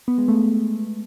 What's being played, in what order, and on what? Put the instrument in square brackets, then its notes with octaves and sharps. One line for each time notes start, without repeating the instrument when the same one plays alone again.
[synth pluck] B3
G#3
A3